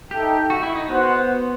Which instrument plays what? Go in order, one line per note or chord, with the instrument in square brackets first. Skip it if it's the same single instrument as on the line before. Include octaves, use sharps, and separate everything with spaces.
[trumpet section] D#4 A4 E5 G5 [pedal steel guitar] G4
[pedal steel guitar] F#4
E4
D#4
[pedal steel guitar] B3 [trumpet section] F#4 C5 F#5